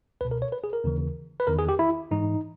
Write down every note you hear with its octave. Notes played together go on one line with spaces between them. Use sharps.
C#2 B2 B4
A#4
C#5
B4
G#4
A#4
D#2 C#3 E3
B4
E2 D#3 A#4
G#4
G4
E4
G#2 E3 D#4